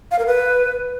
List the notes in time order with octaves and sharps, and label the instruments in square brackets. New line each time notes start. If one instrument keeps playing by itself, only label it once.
[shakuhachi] F5
A#4
B4